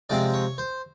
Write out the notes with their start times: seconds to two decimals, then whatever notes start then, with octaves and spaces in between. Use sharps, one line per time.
0.09 C3 F3 G#3 C4 D5
0.34 C#5
0.58 C5